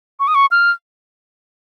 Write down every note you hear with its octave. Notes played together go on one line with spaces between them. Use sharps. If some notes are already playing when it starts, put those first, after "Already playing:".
C#6
D#6
C#6
F6